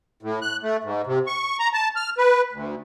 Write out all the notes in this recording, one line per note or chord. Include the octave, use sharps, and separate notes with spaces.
A2
F#6
A3
G#2
C3
C#6
A#5
A5
F6
B4
D2